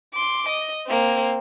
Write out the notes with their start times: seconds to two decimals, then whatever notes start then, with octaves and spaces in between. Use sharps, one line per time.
0.15 C6 D6
0.49 D#5
0.87 A#3 C4